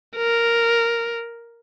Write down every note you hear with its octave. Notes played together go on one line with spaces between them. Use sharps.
A#4